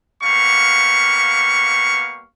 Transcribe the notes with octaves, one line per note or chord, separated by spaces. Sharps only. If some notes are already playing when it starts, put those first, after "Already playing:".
G3 A#3 B3 F5 C#6